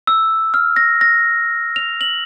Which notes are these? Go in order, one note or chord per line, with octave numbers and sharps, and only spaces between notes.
E6
F6
A#6
A#6
F7
F#7